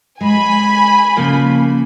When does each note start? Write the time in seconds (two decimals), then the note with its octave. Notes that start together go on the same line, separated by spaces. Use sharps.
0.21 G#3 G#5 B5
1.17 C#3 F3 A#3